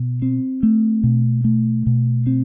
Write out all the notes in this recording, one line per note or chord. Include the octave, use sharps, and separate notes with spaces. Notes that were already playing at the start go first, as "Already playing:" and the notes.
Already playing: B2
C4
A3
B2
A3
B2
C4